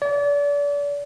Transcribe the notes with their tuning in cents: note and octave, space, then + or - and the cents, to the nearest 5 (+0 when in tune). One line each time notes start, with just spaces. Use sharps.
D5 -35